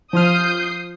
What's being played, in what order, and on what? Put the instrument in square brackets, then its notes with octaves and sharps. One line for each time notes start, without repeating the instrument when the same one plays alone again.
[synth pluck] F3 F4 F6 [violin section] D#6 G6 C7